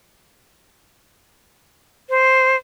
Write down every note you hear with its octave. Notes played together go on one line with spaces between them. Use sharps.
C5